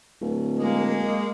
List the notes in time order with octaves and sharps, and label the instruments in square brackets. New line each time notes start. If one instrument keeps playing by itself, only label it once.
[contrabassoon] D1
[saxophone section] G#3 A#3